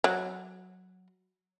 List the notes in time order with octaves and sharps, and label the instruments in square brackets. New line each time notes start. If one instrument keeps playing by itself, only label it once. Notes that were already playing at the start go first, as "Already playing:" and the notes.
[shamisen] F#3